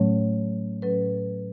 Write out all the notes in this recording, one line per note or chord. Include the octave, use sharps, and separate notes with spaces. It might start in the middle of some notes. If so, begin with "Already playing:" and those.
Already playing: A2 F#3 A3 C#4 C#5
A2 F#3 C#4 B4